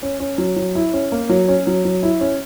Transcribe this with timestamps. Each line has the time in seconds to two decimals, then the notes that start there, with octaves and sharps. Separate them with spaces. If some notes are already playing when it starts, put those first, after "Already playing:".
0.03 C#4
0.20 C#4
0.38 F#3
0.56 F#3
0.75 E4
0.93 C#4
1.12 A#3
1.29 F#3
1.48 C#4
1.67 F#3
1.85 F#3
2.03 E4
2.21 C#4